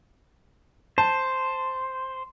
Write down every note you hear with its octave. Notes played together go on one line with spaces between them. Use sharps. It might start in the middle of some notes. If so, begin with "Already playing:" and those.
C5 A5